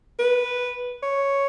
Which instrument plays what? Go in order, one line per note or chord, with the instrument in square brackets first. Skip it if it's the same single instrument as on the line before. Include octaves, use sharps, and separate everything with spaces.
[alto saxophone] B4
C#5